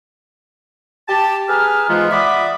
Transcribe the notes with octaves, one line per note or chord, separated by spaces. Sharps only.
G4 A5
G#4 B4 A#5 F6
G#2 E3 G#3 B3 F4
D5 E5 F#5 B5 D6 D#6